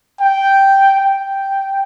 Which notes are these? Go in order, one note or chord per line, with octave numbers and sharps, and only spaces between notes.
G5
G5